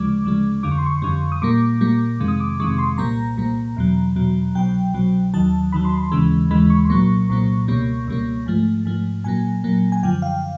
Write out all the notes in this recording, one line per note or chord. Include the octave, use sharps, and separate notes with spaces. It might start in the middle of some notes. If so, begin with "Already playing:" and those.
Already playing: D2 C#3 F3 G#3 D6
D2 C#3 F3 G#3
F2 D3 G3 D6
C#6
C6
C#6
F2 D3 G3
D#6
A#2 G3 A#3 D6
A#2 G3 A#3
F2 C3 D#3 G#3
D#6
D6
F2 C3 D#3 G#3 C#6
C6
C2 A#2 G3 A#3 A#5
C2 A#2 G3 A#3
E2 B2 F#3
E2 B2 F#3
C2 B2 F#3 G5
C2 B2 F#3
D#2 D#3 F#3 A5
D#2 D#3 F#3 B5
C6
B5
D#2 C#3 E3 G#3
D#2 C#3 E3 G#3 B5
C#6
C6
C2 A#2 F#3 A#3 C#6
C2 A#2 F#3 A#3
C#2 B2 G3 A#3
C#2 B2 G3 A#3
G#2 F3 A3
G#2 F3 A3
A#2 F#3 A#3 G#5
A#2 F#3 A#3
G#5
F#2 D3 F3 G5
F5